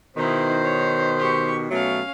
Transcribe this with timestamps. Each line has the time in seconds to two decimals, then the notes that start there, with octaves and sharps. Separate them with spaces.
0.17 B2 D#3 D#4 E4 C5
0.63 C#5
1.18 G4 C#6
1.71 B2 F#3 A3 C#4 F5